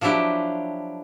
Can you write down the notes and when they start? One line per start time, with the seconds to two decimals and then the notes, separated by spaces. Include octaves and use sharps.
0.01 F3 F#3 D4 E4 G4